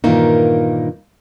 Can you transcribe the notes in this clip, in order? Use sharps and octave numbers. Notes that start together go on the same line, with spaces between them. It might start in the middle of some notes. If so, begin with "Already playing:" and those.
G2 A#2 D#3 E3 A#3 D#4